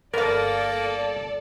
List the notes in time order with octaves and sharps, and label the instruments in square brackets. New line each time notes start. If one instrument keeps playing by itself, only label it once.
[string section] G1 A4 D5 [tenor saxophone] A#3 [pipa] B3 F5 [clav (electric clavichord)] A#4